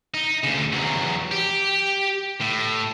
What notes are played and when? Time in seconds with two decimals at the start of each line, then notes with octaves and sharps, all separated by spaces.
0.14 D#4
0.44 D2 C#3
0.73 E2 F#3
1.31 G4
2.41 A2